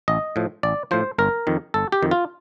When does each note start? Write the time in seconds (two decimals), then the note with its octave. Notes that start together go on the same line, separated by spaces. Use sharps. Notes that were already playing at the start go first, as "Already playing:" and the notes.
0.08 A1 D#5
0.36 A2 F3
0.63 A1 D5
0.91 A2 F3 C5
1.18 G1 A#4
1.47 F2 D#3
1.74 G1 A4
1.92 G4
2.03 F2 D#3
2.11 F4